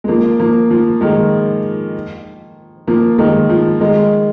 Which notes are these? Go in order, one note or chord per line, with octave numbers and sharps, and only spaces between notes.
G#3
F3 A#3
F3 A#3
F3
D#3 G#3
F3 A#3
D#3 G#3
F3
D#3 G#3